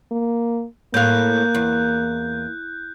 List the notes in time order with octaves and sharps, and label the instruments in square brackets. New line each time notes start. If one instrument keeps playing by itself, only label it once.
[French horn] A#3
[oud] A2 F5 [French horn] A#3 [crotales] F#6 G6
[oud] E2